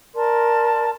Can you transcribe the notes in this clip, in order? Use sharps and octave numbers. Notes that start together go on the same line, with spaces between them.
A#4 D5 A5 C6